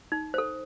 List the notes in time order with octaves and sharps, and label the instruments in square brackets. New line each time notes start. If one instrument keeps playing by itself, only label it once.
[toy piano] D#4
A4 C5